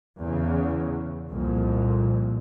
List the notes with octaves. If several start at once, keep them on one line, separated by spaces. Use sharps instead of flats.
E2 C#3
C2 F2 A#2